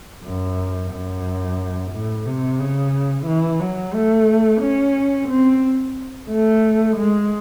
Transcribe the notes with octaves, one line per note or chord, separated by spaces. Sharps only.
F#2
F#2
A2
C3
C#3
E3
F#3
A3
C#4
C4
A3
G#3